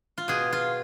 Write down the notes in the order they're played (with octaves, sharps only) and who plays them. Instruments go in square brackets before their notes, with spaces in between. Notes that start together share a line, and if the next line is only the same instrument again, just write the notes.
[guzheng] F4
B2 G#4
F4